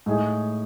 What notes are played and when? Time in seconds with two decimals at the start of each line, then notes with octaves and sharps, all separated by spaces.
0.06 A2 G#3 D#4 G#4